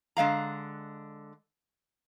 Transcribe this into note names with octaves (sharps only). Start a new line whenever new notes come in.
D3 G#3 F5 A#5